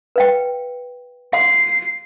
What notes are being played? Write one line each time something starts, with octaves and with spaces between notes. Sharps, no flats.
B4 F5 G5
F5 C6 C7